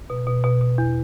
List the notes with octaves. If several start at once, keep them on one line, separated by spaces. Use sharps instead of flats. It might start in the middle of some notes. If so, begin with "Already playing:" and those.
B2
B2
B2
B2
E2